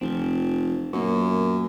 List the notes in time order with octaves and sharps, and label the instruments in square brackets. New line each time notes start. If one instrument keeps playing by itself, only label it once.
[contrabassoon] F1 [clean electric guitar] F3 C4
[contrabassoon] F#2 [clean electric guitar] A#2 A#3 B3